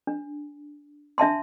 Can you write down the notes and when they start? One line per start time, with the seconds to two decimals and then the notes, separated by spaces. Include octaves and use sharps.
0.07 D4
1.18 D4 E5 A5 C6